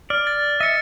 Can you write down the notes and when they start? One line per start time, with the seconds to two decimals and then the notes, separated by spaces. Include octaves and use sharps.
0.10 D5 F6
0.27 A6
0.60 D#5 E5 A6 C#7